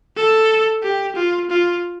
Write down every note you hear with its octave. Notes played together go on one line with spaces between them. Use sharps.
A4
G4
F4
F4